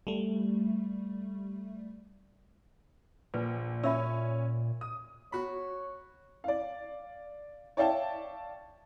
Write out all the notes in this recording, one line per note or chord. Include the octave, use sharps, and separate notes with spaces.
G3 A3
A#1 A#2 B4
C#4 F4 E5 E6
D#6
F#4 C#5 B5
D5 F5
C#5 D5 E5 F5 G5 A5